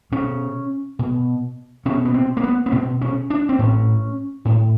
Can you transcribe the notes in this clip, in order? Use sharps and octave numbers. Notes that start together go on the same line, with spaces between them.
B2 C#4
B2
B2 C#4
B3
C4
A#3
B3
B3
B2 C4
C#4
D4
C4
A2 C#4
A2